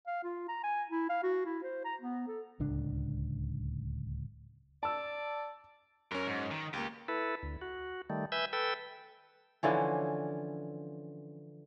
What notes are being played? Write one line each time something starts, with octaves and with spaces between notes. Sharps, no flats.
F5
F4
A#5
G#5
E4
F5
F#4
E4
C5
A#5
B3
A4
D1 C#2 D4
D5 A5 E6
F#2 C#4 A#4
G#2
D#3
C#2 A#3 G4
E4 A4 B4
D2
F#4
D#3 G3 A3
B4 E5 G#5 E6 G6
A4 B4 G5 E6
D3 E3 F3 C#4